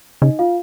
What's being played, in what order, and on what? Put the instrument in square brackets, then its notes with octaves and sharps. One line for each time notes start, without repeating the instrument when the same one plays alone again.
[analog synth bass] C#3 [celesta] D#4 D#5
[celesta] F4 F5